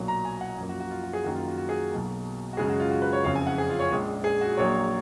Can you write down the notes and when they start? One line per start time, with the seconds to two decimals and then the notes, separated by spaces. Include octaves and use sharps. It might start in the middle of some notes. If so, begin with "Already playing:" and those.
Already playing: B1 A#2 F#3 A#3
0.08 A#5
0.25 G#5
0.41 F#5
0.58 F#2 F3 A#3
0.69 F#4
0.80 F#4
0.91 F4
1.03 F#4
1.13 G#4
1.24 F#2 D#3 F#3 A#3 F#4
1.35 F4
1.47 F#4
1.58 F#4
1.69 G#4
1.91 B1 B2 F#3 A#3
2.53 F#4
2.57 F#2 C#3 G#3 G#4
2.69 F#4
2.80 F4
2.91 F#4
3.02 B4
3.13 C#5
3.24 F#1 F2 C#3 F5
3.35 G#5
3.47 F#5
3.58 G#4
3.69 F4
3.80 C#5
3.91 A#1 A#2 G#3
4.24 G#4
4.41 F#4
4.57 A#1 A#2 F#3 A#3 C#5